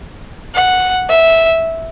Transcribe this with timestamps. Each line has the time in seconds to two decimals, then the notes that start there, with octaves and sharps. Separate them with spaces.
0.55 F#5
1.09 E5